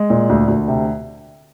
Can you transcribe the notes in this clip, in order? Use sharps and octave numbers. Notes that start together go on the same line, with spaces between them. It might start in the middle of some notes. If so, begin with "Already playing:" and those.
Already playing: G#3
A#2
D2
D2
C3